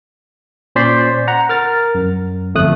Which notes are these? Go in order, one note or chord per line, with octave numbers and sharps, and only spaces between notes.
A#2 C#4 C5 D5 B6 C7
F#5 A#5
A#4 F6 A6
F#2
G1 F2 A3 D#6 F#6